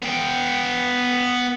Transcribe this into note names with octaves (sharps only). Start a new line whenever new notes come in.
B3 G5